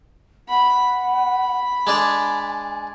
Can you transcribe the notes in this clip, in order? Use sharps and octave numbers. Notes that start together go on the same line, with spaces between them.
F#5 B5
B5
G#3 D4 G#4 G#5